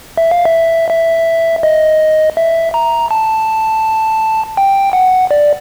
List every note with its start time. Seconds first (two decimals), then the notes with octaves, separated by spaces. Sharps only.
0.18 E5
0.31 F5
0.45 E5
0.91 E5
1.63 D#5
2.37 E5
2.74 A#5
3.11 A5
4.57 G5
4.93 F#5
5.31 D5